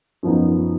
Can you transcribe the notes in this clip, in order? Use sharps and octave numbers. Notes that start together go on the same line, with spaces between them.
F#2 F3 B3 D#4